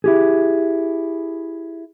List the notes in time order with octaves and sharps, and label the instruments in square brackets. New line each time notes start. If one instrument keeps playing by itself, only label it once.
[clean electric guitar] E4 G4 G#4